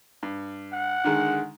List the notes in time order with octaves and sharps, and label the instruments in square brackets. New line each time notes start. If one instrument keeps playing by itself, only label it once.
[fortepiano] G2
[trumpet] F#5
[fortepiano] D3 D#3 G#3